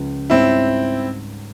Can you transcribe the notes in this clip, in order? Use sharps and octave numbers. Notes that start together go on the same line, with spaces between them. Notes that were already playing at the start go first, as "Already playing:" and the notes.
Already playing: C#2 C#3 F3
G#2 G3 C4 C#4 E4